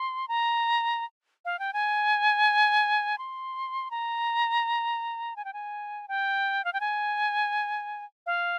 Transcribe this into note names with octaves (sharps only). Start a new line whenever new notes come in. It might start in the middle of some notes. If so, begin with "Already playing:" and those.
Already playing: C6
A#5
F5
G5
G#5
C6
A#5
G#5
G5
G#5
G5
F5
G5
G#5
F5